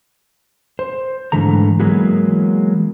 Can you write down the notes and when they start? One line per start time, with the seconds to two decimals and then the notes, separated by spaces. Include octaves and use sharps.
0.79 C5
1.32 G#2 B2 D3 E3 A3 A#5
1.80 E3 F#3 G#3 A#3 B3 F#4